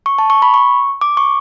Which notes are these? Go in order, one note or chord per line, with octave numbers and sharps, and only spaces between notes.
C#6
A5
C#6
B5
C#6
D6
C#6